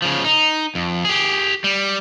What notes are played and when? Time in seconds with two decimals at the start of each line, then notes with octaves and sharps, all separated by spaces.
0.02 C#3 F3
0.24 D#4
0.75 F2
1.05 G4 G#4
1.64 G3